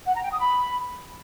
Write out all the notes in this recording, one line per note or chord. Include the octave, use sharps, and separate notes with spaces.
F#5
A#5
G5
D#6
B5